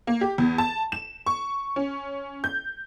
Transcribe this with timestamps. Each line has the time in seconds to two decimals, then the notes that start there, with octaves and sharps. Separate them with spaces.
0.07 A#3
0.21 G4
0.38 E2
0.58 A5
0.92 E7
1.26 C#6
1.76 C#4
2.44 G6